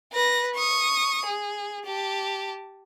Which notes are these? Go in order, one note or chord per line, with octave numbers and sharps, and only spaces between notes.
B4 A#6
C#6 D#6
G#4
G4 A5